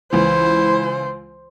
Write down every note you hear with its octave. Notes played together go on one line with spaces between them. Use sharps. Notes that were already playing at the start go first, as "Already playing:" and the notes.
C#2 E3 E4 C5